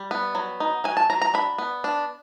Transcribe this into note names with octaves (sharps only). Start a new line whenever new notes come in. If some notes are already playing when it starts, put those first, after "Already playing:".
Already playing: G3
B3
F#3
D#4
F#3 G#5
A5
F#3 A#5
A#5
D4 B5
B3
D4